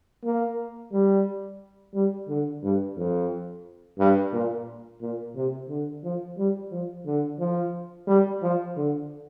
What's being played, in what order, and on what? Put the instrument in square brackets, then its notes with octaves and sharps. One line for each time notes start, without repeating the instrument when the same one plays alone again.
[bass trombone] A#3
G3
G3
D3
G2
F2
G2
A#2
A#2
C3
D3
F3
G3
F3
D3
F3
G3
F3
D3